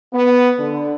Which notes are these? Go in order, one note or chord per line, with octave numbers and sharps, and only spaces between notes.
B3
D3